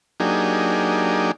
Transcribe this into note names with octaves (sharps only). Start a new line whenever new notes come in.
F#3 A#3 D4 D#4 G4 G#4